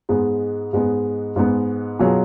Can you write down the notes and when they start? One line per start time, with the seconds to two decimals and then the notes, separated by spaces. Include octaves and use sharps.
0.09 G#2 G#3 B3
0.73 G#2 G#3 B3
1.36 G#2 G#3 B3
1.99 B2 F#3 B3 F4 G#4